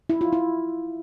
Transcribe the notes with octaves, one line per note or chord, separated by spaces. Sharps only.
E4
F4
E4